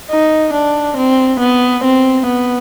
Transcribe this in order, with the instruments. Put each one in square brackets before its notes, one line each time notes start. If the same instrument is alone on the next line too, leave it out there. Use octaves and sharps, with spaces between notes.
[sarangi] D#4
D4
C4
B3
C4
B3